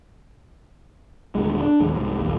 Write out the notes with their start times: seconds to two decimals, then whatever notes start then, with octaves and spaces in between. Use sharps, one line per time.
1.35 D#1 D2 G#3
1.62 D4
1.80 A#1 D#2 G#3
1.95 C2 G#2
2.21 A#1 D#2